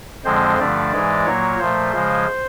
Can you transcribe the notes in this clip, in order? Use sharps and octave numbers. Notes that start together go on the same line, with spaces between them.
F2 D3 F3 G#3 C4 C5
G2 D3 F3 A3 D5
G#2 E3 G#3
A#2 F#3 A#3 C#5
A#2 F3 A3 C5
C#3 F3 G#3